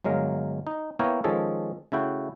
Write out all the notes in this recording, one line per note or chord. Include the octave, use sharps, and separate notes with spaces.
G1 F#3 G#3 A#4 F5
D#4
A#3 B3 E4 A#4 C#5 G5
D#3 F3 G#3 C#4 G#4 A4
C#3 A3 E4 F#4 G5